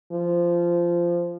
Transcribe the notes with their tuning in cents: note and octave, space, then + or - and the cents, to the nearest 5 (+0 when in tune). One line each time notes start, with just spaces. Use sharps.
F3 -15